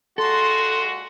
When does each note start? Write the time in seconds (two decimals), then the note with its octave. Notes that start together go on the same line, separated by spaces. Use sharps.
0.18 A#2 G#3 F#4 A4 C6